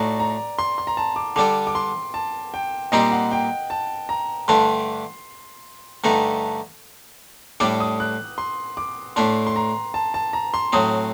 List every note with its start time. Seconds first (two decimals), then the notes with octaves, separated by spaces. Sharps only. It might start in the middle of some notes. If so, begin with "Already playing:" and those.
Already playing: A2 A3 D#4 F#4 D5
0.19 A#5
0.59 C6
0.78 C6
0.87 A#5
0.97 A5
1.16 D6
1.36 D3 G3 D4 A4 D6
1.67 D6
1.75 C6
2.14 A5
2.54 G5
2.92 A#2 G3 C4 D#4 G4 D#5
3.11 F#5
3.32 G5
3.70 A5
4.09 A#5
4.48 G2 D3 A3 D4 C6
6.04 G2 D3 A3 D#4 A4
7.60 A2 G3 D4 A4 D6
7.80 D#6
8.00 F#6
8.38 C6
8.77 D6
9.16 A2 A3 D4 C6
9.47 C6
9.56 A#5
9.94 A5
10.14 A5
10.33 A#5
10.54 C6
10.73 A2 F#3 C4 D#6